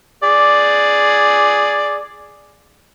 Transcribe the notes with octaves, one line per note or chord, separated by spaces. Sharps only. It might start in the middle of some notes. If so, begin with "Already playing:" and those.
G#4 D5